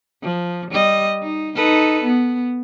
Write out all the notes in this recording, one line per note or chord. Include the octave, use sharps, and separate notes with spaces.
F3
G3 D#5
D#4
D#4 A4 B4
B3